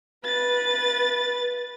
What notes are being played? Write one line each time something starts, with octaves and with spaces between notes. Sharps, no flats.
B4 A6